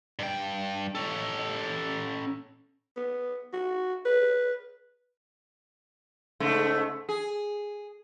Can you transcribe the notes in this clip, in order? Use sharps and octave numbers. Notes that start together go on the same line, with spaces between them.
G2 G5
C#4 A4
B3
F#4
B4
G#2 C#3 A3
G#4